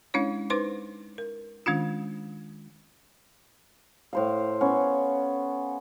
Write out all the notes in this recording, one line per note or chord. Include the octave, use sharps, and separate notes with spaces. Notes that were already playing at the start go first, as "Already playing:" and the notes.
G#3 C#4 D4 E4 C#5
D#4 B4 C5 C6 D6
A#4
D#3 G#3 C#4 D4 F4
A2 C5 F5
B3 C#4